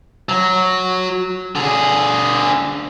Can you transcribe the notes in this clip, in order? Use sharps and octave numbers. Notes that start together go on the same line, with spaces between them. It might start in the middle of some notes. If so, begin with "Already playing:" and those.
F#3
D3 G#4